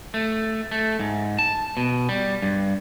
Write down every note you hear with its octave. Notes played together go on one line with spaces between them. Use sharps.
A3
A3
G#2
A5
B2
G3
G2